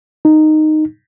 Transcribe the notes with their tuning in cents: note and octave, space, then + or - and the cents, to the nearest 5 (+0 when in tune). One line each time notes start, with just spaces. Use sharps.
D#4 -10